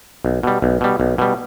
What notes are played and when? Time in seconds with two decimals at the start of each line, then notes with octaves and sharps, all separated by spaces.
0.25 B1
0.43 B2 G3
0.62 B1
0.81 B2 G3
1.00 B1
1.18 B2 G3